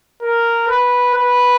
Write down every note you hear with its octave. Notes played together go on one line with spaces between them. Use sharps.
A#4
B4
B4